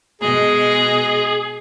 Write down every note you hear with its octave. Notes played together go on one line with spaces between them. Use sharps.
B2 G#3 G#4 D#5